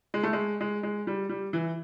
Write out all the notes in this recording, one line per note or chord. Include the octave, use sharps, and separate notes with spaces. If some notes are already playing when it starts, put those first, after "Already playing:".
G#3
A3
G#3
G#3
G#3
G3
G3
E3